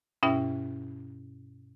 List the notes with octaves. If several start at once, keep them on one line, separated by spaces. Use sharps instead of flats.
G2 B2 C#4 E4 E5 G5